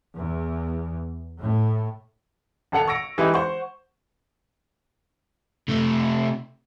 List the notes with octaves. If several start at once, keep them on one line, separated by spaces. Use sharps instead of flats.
E2
A2
G#1 A4 F#5 C#7 F7
C#6 E6 A#6 D7
E3 G#3 D#4 E4 G4 B4
C5 F#5 C#6
C3 A3